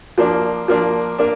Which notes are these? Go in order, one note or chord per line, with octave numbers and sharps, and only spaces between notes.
F3 A#3 D4
F3 A#3 D4
A#3 D4